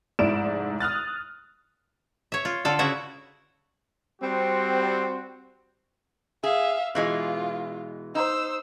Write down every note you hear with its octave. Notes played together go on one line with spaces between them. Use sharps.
F1 G#2 E4 D5 D7 E7
D#6 F6 F#6 A6
C#5 E5
F4
D3 F4 A4
C#3 E4 F#4 E5
G3 C4 F#4
G#4 E5 F5
B2 E3 G#3 F4
D#4 C5 E6